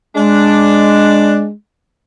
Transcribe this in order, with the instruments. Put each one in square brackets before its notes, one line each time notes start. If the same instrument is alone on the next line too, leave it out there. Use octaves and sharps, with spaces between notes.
[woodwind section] G#3 [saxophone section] D4